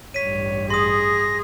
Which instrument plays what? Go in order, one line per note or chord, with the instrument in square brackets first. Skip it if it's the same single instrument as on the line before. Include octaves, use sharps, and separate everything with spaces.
[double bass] A1 G2 [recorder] C#5 [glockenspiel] B6 D#7
[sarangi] G#4 [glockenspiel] C6 D#6 [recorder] A#6